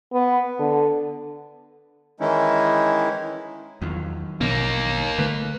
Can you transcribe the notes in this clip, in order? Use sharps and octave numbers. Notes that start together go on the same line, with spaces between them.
B3
D3
D#3 E3 G#3 C#4 D#4 E4
E2 D#3 F3 F#3
A#1 B2 A#3 B3 D#4
D3 A3 B4 B5